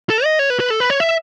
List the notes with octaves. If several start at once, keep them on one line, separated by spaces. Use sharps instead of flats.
A4
D#5
C#5
B4
B4
A4
B4
C#5
E5